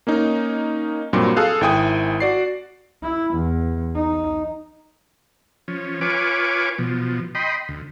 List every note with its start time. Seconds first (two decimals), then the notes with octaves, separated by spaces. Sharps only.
0.07 A#3 C#4 D#4
1.13 G2 A#2 F#3 C4 C6
1.36 G#4 A4 F5 F#6
1.61 G#1 E4 G5 G#5 D#6
2.20 F#4 D5 C7
3.03 E4
3.35 E2
3.95 D#4
5.68 F3 C#4
6.01 F4 B4 C#5 G#5 D6
6.79 B2 F3
7.35 D#5 G5 B5 C6
7.69 D2